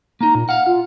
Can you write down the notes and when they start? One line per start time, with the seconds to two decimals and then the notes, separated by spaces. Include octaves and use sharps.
0.21 A#3 D#4 A#5
0.35 A#2
0.49 F5 F#5 F6
0.66 F4